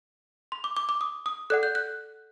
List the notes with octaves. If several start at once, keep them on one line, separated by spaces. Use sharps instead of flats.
C6
D6
D6
D6
D#6
D#6
A4 D5 F#5 F#6
G6
F#6